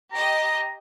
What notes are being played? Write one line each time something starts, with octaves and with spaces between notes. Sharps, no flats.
G4 D#5 A#5